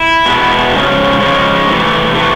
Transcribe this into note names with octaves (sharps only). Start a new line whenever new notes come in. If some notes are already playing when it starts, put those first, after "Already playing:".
Already playing: E4
B2 G#3 B3 E4
C#3 F3 G#3 C#4
C#3 F3 G#3 C#4
C3 E3 A3
C3 E3 A3